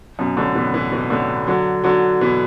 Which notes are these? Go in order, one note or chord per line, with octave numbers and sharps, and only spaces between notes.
F#2 B2
A2 D3
B2 E3
B2 E3
B2 E3
A2 D3
D3 F#3
D3 F#3
B2 E3